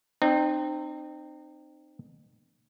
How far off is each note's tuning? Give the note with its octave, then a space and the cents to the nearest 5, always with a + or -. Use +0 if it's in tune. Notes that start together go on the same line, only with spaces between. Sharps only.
C4 +0 D#4 -35